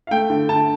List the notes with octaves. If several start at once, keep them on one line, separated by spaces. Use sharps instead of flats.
F5
A3 G5
D3
D3 A5